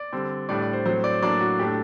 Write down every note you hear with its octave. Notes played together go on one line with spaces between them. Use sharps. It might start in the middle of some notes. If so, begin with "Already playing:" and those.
Already playing: D5
D3 G3 C4
A2 G3 D4 D5
D5
C5
A2 F#3 C4 C5
D5
A2 F#3 A#3 D4 D5
F#4
A2 A3 D4 G4